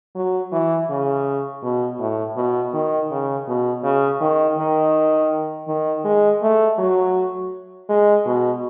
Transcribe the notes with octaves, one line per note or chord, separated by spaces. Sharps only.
F#3
E3
C#3
B2
A2
B2
D#3
C#3
B2
C#3
D#3
D#3
D#3
G#3
A3
F#3
G#3
B2